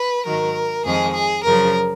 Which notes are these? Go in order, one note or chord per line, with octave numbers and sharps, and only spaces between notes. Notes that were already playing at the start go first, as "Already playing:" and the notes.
Already playing: B4
G#2 D#3 F#3 A#4
F2 D#3 G#3 G#4
G#4
F#2 C#3 F3 A#4